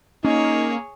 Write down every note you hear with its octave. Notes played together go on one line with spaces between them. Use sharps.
A#3 C#4 D#4 G#4 C#5